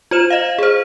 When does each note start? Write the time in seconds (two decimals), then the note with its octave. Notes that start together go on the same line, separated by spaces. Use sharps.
0.11 F4 C5 E7
0.30 D#5 F5
0.59 G#4 C5